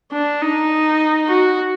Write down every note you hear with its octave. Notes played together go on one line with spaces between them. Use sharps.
D4
D#4
F#4